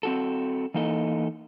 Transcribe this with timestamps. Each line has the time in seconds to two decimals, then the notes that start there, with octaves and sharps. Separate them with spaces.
0.03 C4 F#4 A4
0.74 E3 A#3 D#4 A4 D#5